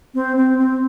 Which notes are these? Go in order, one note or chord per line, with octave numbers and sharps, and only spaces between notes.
C4
C4
C4